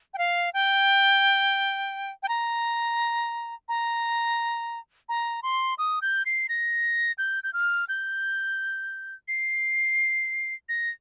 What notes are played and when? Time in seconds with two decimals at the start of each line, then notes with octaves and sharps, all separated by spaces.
0.14 G5
0.18 F5
0.54 G5
2.23 G5
2.28 A#5
3.68 A#5
5.09 A#5
5.43 C6
5.78 D#6
6.02 G6
6.26 C7
6.49 A#6
7.18 G6
7.44 G6
7.53 F6
7.89 G6
9.28 C7
10.69 A#6